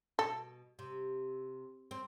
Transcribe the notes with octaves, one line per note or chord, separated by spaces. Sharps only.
B2 A4
C3
C4